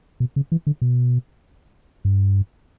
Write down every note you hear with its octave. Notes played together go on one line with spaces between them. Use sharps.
B2
C#3
E3
D3
B2
G2